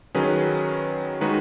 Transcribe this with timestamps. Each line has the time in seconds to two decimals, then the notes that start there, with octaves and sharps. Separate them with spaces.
0.15 D#3 F#3 C#4 G#4 B4
1.21 D#3 G#3 D#4 F#4 B4